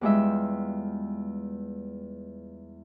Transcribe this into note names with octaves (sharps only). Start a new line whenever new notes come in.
E2 G3 G#3 E4 F4 E5